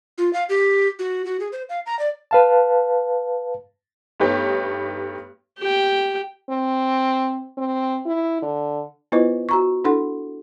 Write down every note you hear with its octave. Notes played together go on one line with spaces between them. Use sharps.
F4
F5
G4
F#4
F#4
G#4
C5
F5
A#5
D5
B4 F5 A5
G2 A3 B3 D#4 G4 C#5
G4 G5
C4
C4
E4
D3
B3 E4 F4 B4 C5 D#5
F#4 A#5 C#6
D4 E4 A4 F#5 C6